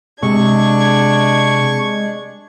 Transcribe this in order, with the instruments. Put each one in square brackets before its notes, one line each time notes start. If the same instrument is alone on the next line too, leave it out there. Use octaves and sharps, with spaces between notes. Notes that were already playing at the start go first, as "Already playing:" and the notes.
[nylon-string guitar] C3 [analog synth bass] G#3 [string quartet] D4 G#6 [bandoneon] C#6